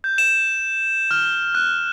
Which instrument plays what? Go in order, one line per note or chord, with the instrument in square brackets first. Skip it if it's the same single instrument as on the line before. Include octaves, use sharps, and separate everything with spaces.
[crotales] G6
E7
F6
F#6